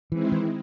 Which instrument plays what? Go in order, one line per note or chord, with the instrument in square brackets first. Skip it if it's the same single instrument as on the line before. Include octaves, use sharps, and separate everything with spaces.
[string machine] D#3 G#3 C4 E4 [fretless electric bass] E3
[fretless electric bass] E3